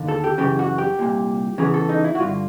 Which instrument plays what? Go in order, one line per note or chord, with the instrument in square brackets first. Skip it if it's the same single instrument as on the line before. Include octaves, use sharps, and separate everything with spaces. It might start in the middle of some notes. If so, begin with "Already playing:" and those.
Already playing: [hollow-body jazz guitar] D#2 D3
A4
G4
F#2 C#3 E3 G4
F#4
G4
C2 A#2
E2 C#3 E3 G#4
A4
D#4
E4
F#4
G2 D3 F4